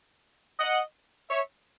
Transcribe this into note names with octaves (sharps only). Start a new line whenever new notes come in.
D#5 F#5
C#5 E5